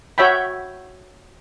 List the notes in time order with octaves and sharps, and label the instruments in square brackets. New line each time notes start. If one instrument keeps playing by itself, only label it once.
[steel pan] F#4 C#5 E5 G5 B5